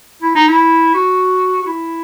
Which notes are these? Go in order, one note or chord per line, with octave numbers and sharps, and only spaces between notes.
E4
D#4
E4
F#4
F#4
E4